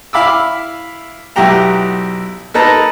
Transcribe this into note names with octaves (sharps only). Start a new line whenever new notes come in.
E4 E5 F5 B5 D6 E6
B1 E4 G4 F#5 G5 A#5
A#3 D#4 A4 B4 A5 A#5